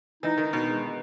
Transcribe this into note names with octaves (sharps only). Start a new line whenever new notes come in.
E3 D#4
D#3
D#4
B2
G#3